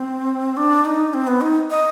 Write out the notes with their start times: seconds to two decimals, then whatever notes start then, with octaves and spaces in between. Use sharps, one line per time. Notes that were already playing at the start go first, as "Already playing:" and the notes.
Already playing: C4
0.57 D4
0.85 D#4
1.14 C4
1.27 B3
1.41 D#4
1.70 D#5